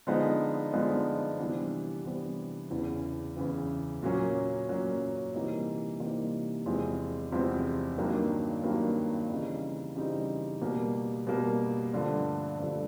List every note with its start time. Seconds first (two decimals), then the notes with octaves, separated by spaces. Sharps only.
0.07 D3 F3 G#3 B3 D#4
0.73 D3 F3 G#3 B3 D#4
1.39 C3 E3 G3 B3 D4
2.05 C3 E3 G3 B3 D4
2.71 E2 C#3 E3
3.37 E2 C#3 E3
4.02 A#2 F#3 A#3 C#4
4.68 A#2 F#3 A#3 C#4
5.34 C3 E3 G3 A#3 D#4
5.99 C3 E3 G3 A#3 D#4
6.66 E2 C3 F3 G#3 C4
7.32 E2 C3 F3 G#3 C4
7.98 G2 D#3 F#3 A#3 D4
8.63 G2 D#3 F#3 A#3 D4
9.29 C#3 E3 G3 C4 D#4
9.95 C#3 E3 G3 C4 D#4
10.61 B2 G3 A#3
11.27 B2 G3 A#3
11.93 G2 D3 F3 A3
12.59 G2 D3 F3 A3